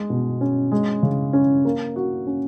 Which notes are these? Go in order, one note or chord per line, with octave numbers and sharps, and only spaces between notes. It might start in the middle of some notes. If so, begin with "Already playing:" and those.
Already playing: G#3
B2
C#4
G#3
C#3
C#4
A#3
F#4
C#4